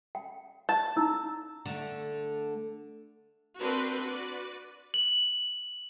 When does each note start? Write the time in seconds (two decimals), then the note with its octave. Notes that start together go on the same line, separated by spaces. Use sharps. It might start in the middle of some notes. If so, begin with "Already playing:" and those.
0.15 G5
0.69 A5
0.96 D#4 E4 E6
1.66 D3 A3
3.59 C4 D4 F#4 A#4 B4 C6
4.01 F#4 B4 D5
4.94 F#7